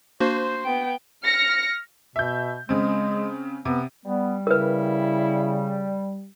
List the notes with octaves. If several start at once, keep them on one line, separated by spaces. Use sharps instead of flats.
A#3 D4 F#4 C5
B3 G5
F6 A#6 C#7
B2 E5 G6
C#3 G#3 C4
C3 B3
G3 B3
C#3 E4 A#4 B4